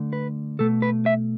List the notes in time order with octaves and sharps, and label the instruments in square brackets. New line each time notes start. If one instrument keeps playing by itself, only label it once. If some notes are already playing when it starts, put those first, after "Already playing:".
Already playing: [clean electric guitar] D3 A3
B4
B2 A3 A4
B4
E5